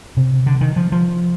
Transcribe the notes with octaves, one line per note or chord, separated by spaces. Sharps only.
C3
D3
D#3
F3
F3